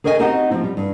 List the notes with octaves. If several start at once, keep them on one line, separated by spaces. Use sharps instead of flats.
G#4 A#4 C#5 D#5 E5 G#5
C4 D#4 F#4 G4 D#5 F#5
F3 C4
G3
G2